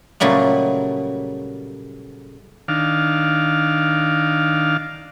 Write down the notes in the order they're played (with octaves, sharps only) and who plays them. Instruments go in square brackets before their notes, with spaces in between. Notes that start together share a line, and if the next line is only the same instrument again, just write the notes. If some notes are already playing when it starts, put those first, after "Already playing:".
[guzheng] A#2 C#3 F#3 G3 A3
[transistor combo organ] D#3 D4 F5